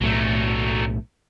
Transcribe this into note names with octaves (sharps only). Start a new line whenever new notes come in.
B1 A2 F#3 A3